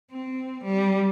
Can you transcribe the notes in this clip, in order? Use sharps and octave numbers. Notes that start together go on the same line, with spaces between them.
C4
G3